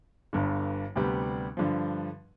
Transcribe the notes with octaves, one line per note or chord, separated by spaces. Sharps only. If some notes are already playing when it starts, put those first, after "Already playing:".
G1 G2 D3
D2 C3 G3 B3
G2 D3 F3